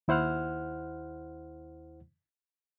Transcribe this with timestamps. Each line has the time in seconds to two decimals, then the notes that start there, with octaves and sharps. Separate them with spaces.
0.08 D#2 E4 C5 F#5 F6